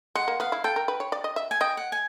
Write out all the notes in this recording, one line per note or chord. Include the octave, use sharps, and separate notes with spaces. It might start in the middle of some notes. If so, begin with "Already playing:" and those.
G#3 F#5
A#3
B3 F5
E4
A4 G5
A#4
B4
C#5
D5
D#5
E5
G#5
D#5 G5
F#5
G#5